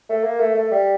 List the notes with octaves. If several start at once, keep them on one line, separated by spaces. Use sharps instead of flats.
A3
A#3
A3
A3
G3